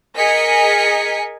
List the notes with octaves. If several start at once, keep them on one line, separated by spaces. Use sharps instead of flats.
G#4 A#4 D#5 G#5 B6 C#7